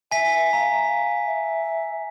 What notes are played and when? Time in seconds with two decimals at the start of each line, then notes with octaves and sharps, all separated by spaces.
0.11 E5 G#5 B6
0.53 F5 A#5
1.27 E5